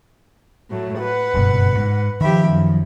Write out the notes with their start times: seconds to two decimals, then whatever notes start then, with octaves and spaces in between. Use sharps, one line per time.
0.70 A2 F#3 A3
1.01 B4 F#5
1.34 F#1 G2 B2
1.75 G#2
2.21 D#3 F3 G4 E5 B5
2.50 F#2